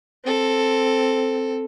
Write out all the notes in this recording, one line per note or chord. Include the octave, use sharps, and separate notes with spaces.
C4 A4